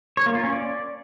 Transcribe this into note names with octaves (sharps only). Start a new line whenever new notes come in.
C#5
A#3
F4
C#4
D5